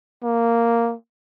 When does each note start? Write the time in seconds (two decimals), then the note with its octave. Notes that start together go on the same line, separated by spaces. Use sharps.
0.23 A#3